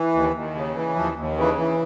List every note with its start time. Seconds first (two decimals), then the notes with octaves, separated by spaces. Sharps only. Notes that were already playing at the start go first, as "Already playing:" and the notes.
Already playing: E3
0.14 D#2
0.34 D#2
0.55 C#3
0.75 E3
0.96 D#2 F3
1.16 D#2
1.37 C#3 E3
1.58 E3